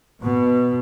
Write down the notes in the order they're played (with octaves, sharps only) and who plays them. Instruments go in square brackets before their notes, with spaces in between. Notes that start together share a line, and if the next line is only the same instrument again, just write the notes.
[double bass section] B2